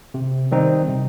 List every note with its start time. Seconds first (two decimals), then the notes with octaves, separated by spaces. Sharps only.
0.14 C3
0.51 D#3 G3 C4 D#4
0.88 C3